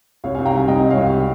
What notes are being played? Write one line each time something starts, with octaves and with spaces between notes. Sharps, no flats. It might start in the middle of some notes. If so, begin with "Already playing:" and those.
C2 C#5 F5
C2 F5 G#5
G5 A#5
G3 F5 G#5
C2 D#5 G5
G3
C#5 F5
C2